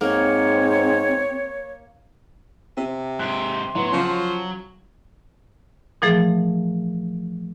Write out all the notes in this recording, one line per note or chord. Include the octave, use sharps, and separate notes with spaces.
G#2 A#3 C4 C#5
C3 C4
G#2 G4 C6 F#6
A2 F#3 B3
C#3 F3 C#6
A#2 E3 F3 A3 G#4